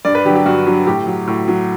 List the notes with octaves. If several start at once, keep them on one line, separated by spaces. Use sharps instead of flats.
G2 D5
B4
D3 F#3 G4
G4
G2 F#4
D3 F#3
A2 G4
F#3
A2
F#3